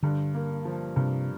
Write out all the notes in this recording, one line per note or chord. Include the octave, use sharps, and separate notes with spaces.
G2 D3
A#3
F3
G2 C3